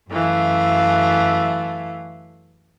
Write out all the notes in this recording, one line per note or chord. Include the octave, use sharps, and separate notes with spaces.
F#2 E3 A3 F5